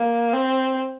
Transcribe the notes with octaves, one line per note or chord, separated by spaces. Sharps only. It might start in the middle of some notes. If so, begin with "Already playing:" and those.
Already playing: A#3
C4